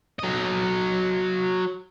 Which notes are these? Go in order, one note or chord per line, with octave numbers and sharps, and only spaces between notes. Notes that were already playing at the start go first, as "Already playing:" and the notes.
F#3 D#5